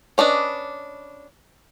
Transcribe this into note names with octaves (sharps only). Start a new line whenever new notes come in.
C#4 D4 B4 D#5